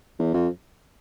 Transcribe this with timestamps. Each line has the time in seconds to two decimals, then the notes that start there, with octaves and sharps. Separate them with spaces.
0.19 E2
0.34 F2